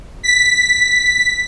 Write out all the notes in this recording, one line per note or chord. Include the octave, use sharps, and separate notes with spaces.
B6